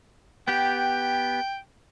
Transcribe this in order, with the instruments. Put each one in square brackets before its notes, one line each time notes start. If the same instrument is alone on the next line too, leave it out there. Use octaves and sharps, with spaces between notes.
[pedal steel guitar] B3 G4 [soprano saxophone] G5